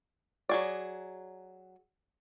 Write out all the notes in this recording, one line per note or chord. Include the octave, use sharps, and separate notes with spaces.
F#3 G#4 D5